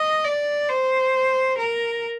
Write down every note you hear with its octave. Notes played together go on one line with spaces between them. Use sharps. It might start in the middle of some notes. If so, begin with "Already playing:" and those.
Already playing: D#5
D5
C5
A#4